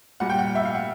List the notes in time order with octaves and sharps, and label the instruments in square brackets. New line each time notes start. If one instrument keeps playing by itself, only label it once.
[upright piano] A#2 G3 F#5
G5
F#5
E5
F5
F#5